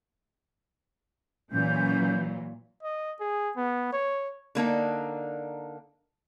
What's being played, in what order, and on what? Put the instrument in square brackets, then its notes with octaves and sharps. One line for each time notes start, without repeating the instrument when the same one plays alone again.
[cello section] A#2 E3 F#3 [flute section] C#4 G6
[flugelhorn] D#5
G#4
B3
C#5
[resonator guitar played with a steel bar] D3 A#3 D4 D#4